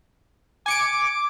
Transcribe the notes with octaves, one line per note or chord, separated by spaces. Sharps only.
G#5 D6 C#7 D7